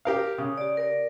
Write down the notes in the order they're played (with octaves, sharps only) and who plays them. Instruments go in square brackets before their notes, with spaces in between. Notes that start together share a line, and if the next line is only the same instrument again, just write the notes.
[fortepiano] G4 A#4 F5
[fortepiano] C#3 [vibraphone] D#6
[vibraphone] G4 D5
A#4 D5